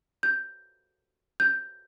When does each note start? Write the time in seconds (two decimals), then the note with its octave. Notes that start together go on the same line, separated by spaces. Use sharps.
0.23 G6
1.40 G6